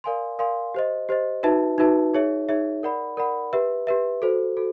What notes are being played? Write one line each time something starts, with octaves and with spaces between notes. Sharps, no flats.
A#4 D5 F5 G#5 C6
A#4 D5 F5 G#5 C6
G4 C5 D#5
G4 C5 D#5
D#4 F#4 B4 E5 A5
D#4 F#4 B4 E5 A5
D#4 G#4 C#5 E5
D#4 G#4 C#5 E5
A#4 D5 F#5 B5
A#4 D5 F#5 B5
G4 B4 E5
G4 B4 E5
F#4 A4 C5
F#4 A4